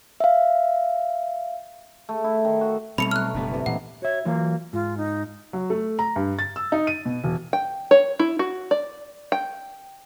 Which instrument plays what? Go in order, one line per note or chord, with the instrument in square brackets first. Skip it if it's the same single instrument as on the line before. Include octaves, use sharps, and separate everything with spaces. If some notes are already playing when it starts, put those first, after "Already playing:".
[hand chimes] E5 F5
[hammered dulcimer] A3
E4
D#3
F#4
[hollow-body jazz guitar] B1 [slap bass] G3 C4 [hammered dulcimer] A3 D6 [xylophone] B5 C#7 F7
[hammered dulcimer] F#3 [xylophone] F6 F#6
[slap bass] F#1 B2 B3 [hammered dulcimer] D3 G3
[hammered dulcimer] C3 E3
[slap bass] A#2 E3 [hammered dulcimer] D#4 [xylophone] F#5
[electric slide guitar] F#4 E5 [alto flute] C#5
[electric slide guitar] E3 F#3 F4 [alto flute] A#3
[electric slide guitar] G#2 [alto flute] F4
[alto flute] D#4
[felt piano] F#3
A3
A#5
G2
A6
E6
D#4
D#7
B2
E1
[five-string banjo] G5
C#5
E4
F#4
D5
G5